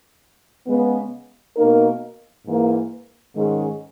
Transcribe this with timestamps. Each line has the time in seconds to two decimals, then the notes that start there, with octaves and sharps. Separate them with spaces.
0.67 C#3 G#3 B3
1.57 B2 A#3 D#4 A#4
2.46 G#2 E3 A#3
3.36 G#2 D#3 G#3 C#4 G#4